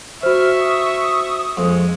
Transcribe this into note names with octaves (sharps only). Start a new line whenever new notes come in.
F#4 C5 E5 C#6 F6
D#6
F2 G#3